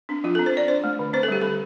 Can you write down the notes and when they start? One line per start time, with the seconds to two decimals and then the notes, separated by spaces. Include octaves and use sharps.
0.09 C4 D4
0.24 F3 F4
0.35 C4 A4
0.46 C5
0.53 C4 D5
0.68 D4 C5
0.84 A3
0.99 D3
1.13 C4 C5
1.23 A4
1.28 G3 G4
1.41 D3 A4